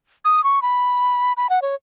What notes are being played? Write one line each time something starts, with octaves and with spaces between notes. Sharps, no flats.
D#6
C#6
B5
B5
F#5
C#5